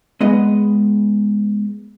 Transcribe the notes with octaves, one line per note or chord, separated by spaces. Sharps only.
G#3 B3 D#5